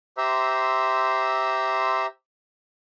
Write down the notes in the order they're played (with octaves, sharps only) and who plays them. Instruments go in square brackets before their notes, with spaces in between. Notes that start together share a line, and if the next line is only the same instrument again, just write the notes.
[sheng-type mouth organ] G4 C5 E5 A#5 C6 E6